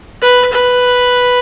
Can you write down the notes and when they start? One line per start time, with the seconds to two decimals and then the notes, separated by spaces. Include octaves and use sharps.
0.22 B4
0.53 B4